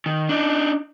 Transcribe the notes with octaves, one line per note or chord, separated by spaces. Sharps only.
D#3
D4 D#4